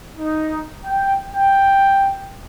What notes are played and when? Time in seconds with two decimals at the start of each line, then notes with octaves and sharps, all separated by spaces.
0.18 D#4
0.85 G5
1.34 G5